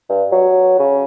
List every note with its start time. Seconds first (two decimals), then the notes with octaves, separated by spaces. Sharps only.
0.09 G2
0.31 F#3
0.79 C#3